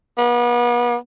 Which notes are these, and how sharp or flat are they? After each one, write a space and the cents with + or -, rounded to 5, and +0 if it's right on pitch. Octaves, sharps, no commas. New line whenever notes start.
B3 -40